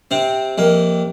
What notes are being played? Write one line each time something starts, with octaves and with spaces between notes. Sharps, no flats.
C3 C4
F2 A#3